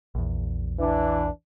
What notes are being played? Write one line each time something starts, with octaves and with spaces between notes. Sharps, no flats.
A#1 E2
E3 D4